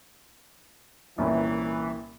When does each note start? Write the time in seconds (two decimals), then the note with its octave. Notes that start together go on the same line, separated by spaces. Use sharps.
1.18 C2 A#2 E3 C#4